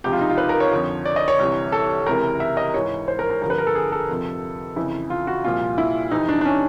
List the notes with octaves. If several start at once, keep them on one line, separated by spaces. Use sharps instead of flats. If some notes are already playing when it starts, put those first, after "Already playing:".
C#2 C3 F3 G4
F4
D#4
F4
B4
A#4
C#5
F2 D3 F3
D5
D#5
C#5
C2 C3 E3
A4
C#2 C3 E3 A#4
E5
D#5
G#2 E3 C#5
C5
A#4
A#4
G2 D3 F3 A#4
B4
A#4
A4
G#4
A4
F2 C3 F3
F2 C#3 E3 E4
F4
F#4
C2 A#2 F3 F4
E4
F2 C3 E3 D#4
D4
D4
C#4